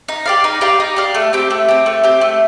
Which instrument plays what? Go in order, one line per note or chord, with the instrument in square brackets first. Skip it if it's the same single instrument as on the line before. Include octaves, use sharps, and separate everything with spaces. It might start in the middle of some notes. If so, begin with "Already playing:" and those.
[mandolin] D#4
G4 D5 F5
D#4
G4 D5 F5
D#4
G4 D5 F5
A3
C4 G4
A3
C4 G4
A3
C4 G4
A3